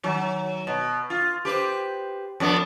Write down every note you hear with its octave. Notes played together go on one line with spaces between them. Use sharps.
D#3 F#3
B2
F4
G4 B4 C5
F2 B3 D4